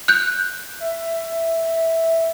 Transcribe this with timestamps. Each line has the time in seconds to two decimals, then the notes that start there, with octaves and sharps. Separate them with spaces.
0.08 F#6 G6
0.80 E5